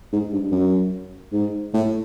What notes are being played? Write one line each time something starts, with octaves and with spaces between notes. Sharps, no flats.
G#2
G2
F#2
G#2
A2